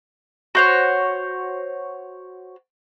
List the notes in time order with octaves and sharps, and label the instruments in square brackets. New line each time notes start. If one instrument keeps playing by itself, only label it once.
[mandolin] F#4 C5 C#5